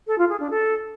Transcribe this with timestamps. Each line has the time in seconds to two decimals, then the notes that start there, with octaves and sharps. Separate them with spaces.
0.07 A4
0.18 F4
0.29 G#4
0.40 D4
0.50 A4